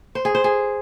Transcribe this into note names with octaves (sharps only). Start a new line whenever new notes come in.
C5
G#4
C5
G#4